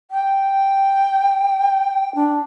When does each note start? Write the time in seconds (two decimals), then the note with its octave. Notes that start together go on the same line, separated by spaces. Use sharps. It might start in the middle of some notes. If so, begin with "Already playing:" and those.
0.11 G5
2.15 D4